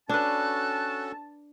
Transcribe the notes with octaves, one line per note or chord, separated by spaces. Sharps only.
C#4 D4 F#4 A4 B4 A5 F#6